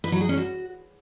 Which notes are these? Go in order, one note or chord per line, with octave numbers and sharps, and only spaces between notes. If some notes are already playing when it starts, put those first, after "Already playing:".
B4
F#3
G#4
C#4
F#4